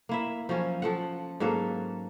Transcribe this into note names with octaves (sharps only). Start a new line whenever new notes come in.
A#3 E4 E5
F3 F#3 C#4
F3 A4 F#5
G#2 F#3 A#3 A4